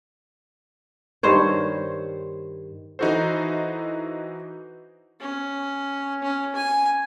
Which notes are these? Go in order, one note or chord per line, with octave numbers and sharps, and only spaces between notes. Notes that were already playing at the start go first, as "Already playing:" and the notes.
G2 D#3 C5 C#5
E3 D#4 E4 F#4 A4 C5
C#4
C#4
G#5